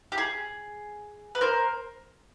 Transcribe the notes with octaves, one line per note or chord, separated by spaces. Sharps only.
G4
G#4
B4
A#4 C5